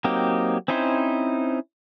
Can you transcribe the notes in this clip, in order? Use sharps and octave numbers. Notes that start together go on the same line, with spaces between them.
F#3 A#3 C4 D#4 G4
C4 C#4 D#4 E4 C5